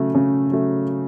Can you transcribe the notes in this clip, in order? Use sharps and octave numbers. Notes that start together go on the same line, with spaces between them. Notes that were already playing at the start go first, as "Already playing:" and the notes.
Already playing: C#3 F#3 A3
C#3
F#3 A3